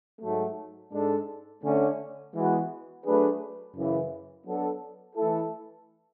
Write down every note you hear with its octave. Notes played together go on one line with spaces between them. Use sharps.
G#2 F#3 A3
G#2 G#3 D4 A4
D3 A3 C#4
E3 G#3 B3 F#4
F#3 A3 D4 G#4 B4
F#2 C#3 E3
F#3 B3 D4 A4
E3 A3 E4 A4